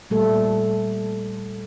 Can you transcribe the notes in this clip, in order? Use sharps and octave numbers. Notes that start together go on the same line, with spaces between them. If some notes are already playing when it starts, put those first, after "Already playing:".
A#2 G3 A3 A4